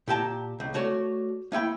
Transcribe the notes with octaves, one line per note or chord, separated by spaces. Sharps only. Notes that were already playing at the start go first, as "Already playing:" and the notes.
A#2 G4 G5 A5 A#5
C#2
A3 F#4 C#5 D5
A#3 E4 G5 B5